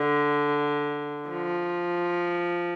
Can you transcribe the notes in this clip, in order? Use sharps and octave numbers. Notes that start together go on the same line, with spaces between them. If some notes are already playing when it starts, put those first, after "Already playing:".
Already playing: D3
F3